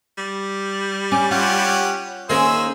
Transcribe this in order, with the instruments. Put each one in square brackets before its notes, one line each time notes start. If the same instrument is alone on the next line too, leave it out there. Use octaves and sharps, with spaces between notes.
[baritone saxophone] G3
[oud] C#4 [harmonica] D6
[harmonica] C#4 G4 F#5 [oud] F4
[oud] D#3 A#3 C#4 [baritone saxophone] G#4 [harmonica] C5 E6